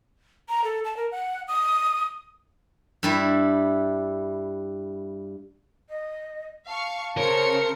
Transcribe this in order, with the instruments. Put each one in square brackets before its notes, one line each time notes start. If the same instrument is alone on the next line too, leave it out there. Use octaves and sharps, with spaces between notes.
[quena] A#5
A4
A5
A#4
F#5
D#6
[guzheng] G2 G3 E4
[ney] D#5
[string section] F5 C#6 [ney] A5
[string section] C#3 C5 C#7 [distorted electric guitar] A#4 [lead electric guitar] C#5